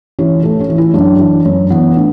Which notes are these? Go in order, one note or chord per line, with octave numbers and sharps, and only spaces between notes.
E3 C#4
A2 A3
C#4
E3
E4
F#2 D4
E3
F#2 C#4
E3 B3
A2 D4